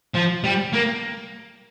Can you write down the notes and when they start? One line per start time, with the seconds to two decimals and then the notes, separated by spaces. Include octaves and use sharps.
0.15 F3
0.44 G3
0.73 A#3